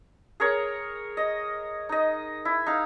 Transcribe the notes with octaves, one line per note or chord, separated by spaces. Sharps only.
G#4 A#4 C#5
D#5
D#4 D#5
E4
D#4 F5